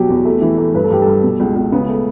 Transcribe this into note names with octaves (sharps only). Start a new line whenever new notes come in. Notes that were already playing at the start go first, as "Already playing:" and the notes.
Already playing: B2 F#3 G4
E2
A3
E3
A3
G2 B4
A4
G2 G4
G2 A4
B2
C#2
C#2
C#3 B3
A3